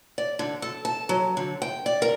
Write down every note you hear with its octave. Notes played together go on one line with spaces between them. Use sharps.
D5
D3
A4
A5
F#3
D3
G5
D5
A#4